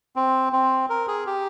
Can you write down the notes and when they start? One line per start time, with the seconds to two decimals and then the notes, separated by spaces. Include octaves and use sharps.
0.16 C4
0.53 C4
0.90 A#4
1.08 G#4
1.26 G4